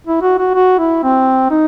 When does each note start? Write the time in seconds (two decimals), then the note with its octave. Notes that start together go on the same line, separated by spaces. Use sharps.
0.07 E4
0.22 F#4
0.38 F#4
0.54 F#4
0.79 E4
1.04 C4
1.51 D#4